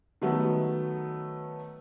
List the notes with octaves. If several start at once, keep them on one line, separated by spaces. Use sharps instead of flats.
D#3 F#3 A3 B3